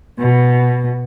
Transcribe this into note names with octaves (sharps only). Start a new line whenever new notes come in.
B2